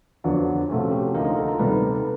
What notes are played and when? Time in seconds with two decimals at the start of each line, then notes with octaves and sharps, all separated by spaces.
0.24 F2 D3 F#3 B3 D4
0.69 C3 F3 A3 C#4 F#4
0.91 G4
1.14 D2 D3 F3 A#3 D#4 A#4
1.25 A#4
1.36 A4
1.48 A#4
1.59 C3 D#3 G3 B3 B4